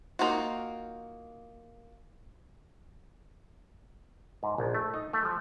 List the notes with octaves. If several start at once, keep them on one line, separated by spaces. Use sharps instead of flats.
A#3 D#4 F4 F#4
G#2
A#1
A3
D#4
A3
F3